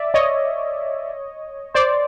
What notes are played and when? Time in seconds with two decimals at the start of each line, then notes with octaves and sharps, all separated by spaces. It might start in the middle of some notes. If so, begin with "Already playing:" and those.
Already playing: D5 E5
0.14 C#5 D#5
1.74 C5 D5